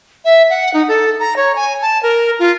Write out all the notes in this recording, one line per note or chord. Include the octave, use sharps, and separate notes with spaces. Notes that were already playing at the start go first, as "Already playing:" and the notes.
E5
F#5
D#4
A4
A#5
C#5
G#5
A5
A#4
F4